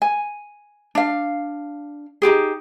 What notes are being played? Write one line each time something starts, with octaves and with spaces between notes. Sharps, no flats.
G#5
D4 F5
D#4 F4 G4 G#4